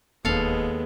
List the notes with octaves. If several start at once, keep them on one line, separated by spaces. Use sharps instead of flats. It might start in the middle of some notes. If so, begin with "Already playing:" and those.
E1 D#2 G#3 B3 A4 F5